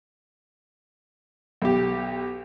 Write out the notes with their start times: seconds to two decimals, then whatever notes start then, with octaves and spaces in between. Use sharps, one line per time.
1.62 B1 G4